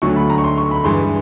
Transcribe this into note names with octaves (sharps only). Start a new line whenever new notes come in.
D2 D3 F#3 A3 C#6
B5
A#5
C#6
C6
C#6
B5
G2 E3 G#3 C6